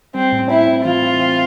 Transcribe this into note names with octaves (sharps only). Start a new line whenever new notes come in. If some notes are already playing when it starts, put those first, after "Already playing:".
G3 C4
A2
C4 E4
C4
E3 F4
C4
C4